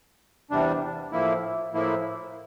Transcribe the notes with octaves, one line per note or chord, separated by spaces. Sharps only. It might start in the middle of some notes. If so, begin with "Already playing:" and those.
E2 C3 G3 D4
A2 F3 A#3 E4
A2 F3 A#3 E4